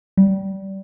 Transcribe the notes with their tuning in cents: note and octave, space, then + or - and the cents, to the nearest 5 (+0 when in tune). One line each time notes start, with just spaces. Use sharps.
G3 -20